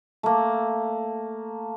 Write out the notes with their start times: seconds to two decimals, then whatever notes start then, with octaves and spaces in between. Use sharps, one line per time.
0.23 A3 A#3